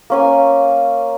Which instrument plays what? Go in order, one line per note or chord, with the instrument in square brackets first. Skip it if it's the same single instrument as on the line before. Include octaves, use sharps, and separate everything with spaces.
[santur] A#3 C#4 G#5